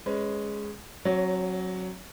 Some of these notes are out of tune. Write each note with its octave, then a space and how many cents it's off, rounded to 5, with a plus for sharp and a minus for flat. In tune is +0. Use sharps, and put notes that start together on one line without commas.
G#3 +0 C#4 +0 B4 +20
F#3 +0 C4 +40 C#5 +30